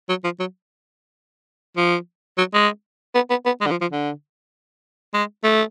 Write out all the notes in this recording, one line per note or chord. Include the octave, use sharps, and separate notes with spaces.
F#3
F3
F#3
F3
F#3
G#3
B3
B3
B3
G#3
D3
F3
F3
D3
G#3
A3